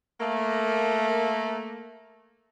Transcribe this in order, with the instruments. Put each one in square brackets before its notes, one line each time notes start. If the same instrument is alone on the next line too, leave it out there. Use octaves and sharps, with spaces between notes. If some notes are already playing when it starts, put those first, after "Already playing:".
[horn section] A3 A#3